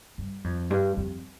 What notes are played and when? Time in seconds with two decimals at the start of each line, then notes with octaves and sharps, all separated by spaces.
0.18 G2
0.44 F2
0.70 G2
0.97 F2